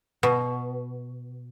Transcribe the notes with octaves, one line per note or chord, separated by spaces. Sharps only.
B2